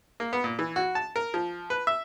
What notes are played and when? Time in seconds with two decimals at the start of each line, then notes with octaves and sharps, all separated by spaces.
0.20 A#3
0.33 B3
0.44 A#2
0.59 E3
0.76 F#4
0.95 A5
1.16 A#4
1.34 F3
1.70 B4
1.87 E5